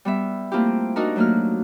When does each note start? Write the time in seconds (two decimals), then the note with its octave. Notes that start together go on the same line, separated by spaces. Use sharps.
0.05 G3 B3 E5
0.52 A3 A#3 C4 E4 F4 G4
0.96 D4 D#4 F#4 A#4
1.16 F#3 A3 A#3 F#4 F6